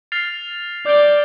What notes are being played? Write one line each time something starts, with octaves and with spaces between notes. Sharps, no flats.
F6 A6 C7 F7
D5 D6 G6 D7 G7